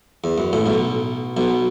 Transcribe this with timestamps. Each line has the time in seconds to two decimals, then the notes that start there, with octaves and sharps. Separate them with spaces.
0.24 E2
0.38 F#2
0.53 A1 A2
0.66 B1 B2
1.37 B1 B2